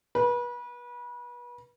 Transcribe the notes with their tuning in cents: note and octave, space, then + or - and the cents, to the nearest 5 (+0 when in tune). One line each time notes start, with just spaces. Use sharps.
B4 -30